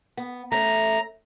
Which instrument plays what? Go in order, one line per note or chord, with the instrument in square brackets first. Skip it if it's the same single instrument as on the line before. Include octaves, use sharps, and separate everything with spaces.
[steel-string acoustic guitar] B3
[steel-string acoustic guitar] A3 C#4 [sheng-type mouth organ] A#5